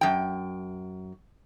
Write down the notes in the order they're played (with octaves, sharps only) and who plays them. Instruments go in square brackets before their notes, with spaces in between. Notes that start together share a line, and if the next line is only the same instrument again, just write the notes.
[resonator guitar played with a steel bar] F#2 G5